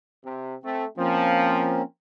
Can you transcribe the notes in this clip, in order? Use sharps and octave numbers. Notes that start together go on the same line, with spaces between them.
C3
A3 C4
F3 A#3 C4 C#4